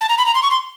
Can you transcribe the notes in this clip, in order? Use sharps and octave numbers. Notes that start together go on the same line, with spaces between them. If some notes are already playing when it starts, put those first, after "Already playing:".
A5
A#5
B5
A#5
C6
C#6
C6